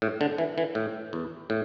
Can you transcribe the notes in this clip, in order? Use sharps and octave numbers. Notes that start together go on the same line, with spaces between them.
A2
D3
E3
E3
A2
E2
A2